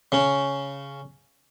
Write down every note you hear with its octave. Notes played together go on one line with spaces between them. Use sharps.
C#3 C#4